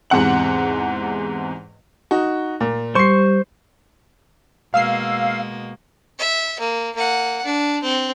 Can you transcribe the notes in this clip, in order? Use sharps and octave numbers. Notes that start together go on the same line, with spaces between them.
E2 G#2 C3 F#5 F#7
D#4 F#4
A#2
G3 C5 C6 C#6 C7
B2 G#3 A#3 F5 E6 C7
E5
A#3
A#3 F#5
D4
C4